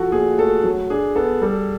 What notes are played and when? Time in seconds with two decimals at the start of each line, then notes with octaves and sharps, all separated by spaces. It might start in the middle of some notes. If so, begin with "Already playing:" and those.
Already playing: F3 F#4 A4
0.12 A#2 G#4
0.38 A3 A4
0.64 F#3
0.90 D4 G#4
1.15 B3 A4
1.42 G3 A4